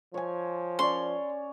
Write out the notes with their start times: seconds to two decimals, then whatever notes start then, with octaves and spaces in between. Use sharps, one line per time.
0.14 F3 C#5 G#5
0.79 C#4 C#5 D5 C6